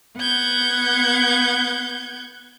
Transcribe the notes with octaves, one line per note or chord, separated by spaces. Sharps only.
B3 F#5 G6 G#6